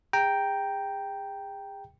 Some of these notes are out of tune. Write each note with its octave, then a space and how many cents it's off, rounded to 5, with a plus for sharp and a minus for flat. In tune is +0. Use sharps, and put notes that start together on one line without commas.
G#4 -35 G5 +0 A#5 +0